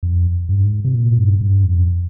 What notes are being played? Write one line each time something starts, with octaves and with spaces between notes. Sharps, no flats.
F2
G2
G#2
C3
A#2
G2
G2
F2